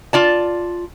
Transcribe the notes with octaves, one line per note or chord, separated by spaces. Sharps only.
F4 D5 A5